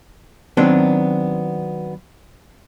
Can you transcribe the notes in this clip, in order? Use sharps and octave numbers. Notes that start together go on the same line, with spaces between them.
D#3 F#3 B3 C4 D4